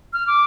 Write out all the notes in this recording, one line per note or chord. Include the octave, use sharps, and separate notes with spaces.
F6
D6